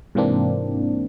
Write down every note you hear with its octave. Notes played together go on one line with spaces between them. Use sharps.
G#2 C3 E3 A#3 C4 D4